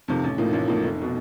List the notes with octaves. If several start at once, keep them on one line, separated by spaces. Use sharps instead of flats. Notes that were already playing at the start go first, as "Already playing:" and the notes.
F2 C3 D#3
A1
A2 F3 A#3 D#4
A1
A2 F3 A#3 D#4
F1
B2